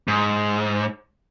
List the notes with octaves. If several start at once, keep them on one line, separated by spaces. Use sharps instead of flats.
G#2